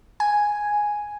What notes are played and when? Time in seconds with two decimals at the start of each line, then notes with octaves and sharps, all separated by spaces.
0.20 G#5